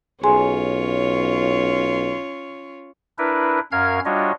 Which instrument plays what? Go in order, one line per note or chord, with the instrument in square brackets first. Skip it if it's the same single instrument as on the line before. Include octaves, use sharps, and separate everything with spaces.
[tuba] B1 [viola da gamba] C#4 F4 C#5 [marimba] G#4 G#5 C6
[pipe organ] D4 E4 A#4 B4
F#2 C#4 A#4 F5 F6 G#6
G3 D4 F4 F#4 C#5 D#5